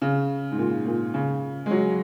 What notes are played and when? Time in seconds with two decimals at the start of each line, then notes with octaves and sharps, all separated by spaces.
0.02 C#3
0.52 G#2
0.58 A#2
0.86 A#2
1.14 C#3
1.66 G#3
1.71 F#3